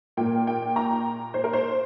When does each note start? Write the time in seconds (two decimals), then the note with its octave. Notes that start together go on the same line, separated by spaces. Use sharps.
0.17 A#2 A#3 G5
0.47 G5
0.76 A#5
1.34 C5
1.44 A#4
1.53 C5